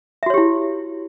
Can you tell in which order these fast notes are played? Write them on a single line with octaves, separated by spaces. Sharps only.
E5 F#4 C#5 G4 E4